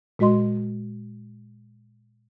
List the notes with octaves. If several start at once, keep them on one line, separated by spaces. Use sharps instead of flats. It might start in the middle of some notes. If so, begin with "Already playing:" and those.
A#2 G#3 F#4 D#5 C6